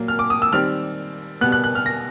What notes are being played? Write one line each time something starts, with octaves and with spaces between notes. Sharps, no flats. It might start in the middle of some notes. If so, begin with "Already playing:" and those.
Already playing: A#2 F#3 A#3
F6
D6
D#6
E6
D#3 G3 C4 F6
B2 G3 B3 F#6
F#6
F#6
F6
A#6